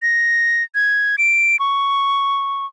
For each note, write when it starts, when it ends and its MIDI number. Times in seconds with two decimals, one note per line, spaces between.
0.02 0.63 94
0.75 1.16 92
1.18 1.59 98
1.59 2.66 85